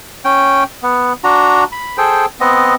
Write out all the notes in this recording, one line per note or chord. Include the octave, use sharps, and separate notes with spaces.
C#4 G5
B3
D4 F#4 A#5
B5
G#4 A4 C5 G5
B3 C4 D#5